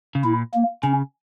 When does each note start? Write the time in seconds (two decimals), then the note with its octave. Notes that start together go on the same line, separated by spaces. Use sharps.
0.15 C#3
0.24 A#2 E4
0.54 A#3
0.83 C#3 C#4